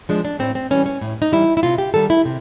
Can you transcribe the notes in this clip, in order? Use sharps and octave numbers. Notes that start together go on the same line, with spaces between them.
F3 G#3 D4
D4
A2 C4
C4
E3 G3 C#4
C#4
A2
D#4
E3 G3 E4
E4
C3 F4
G4
D#3 G3 A4
E4
C3